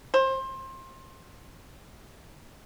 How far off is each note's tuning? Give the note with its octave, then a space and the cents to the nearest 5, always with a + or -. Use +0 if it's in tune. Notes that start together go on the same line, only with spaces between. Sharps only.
C5 +25